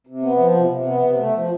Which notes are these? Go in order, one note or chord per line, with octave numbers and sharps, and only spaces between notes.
C3
B3
F3
C3
C3
B3
C3
A3
F3